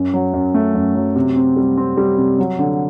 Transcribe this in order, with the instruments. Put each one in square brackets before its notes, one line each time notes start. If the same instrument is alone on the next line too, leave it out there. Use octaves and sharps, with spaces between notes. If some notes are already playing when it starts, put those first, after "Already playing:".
Already playing: [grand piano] F#2
F#3
F#2
A3
F#2
F#3
C3
C4
G3
C4
G3
C3
F#3
D3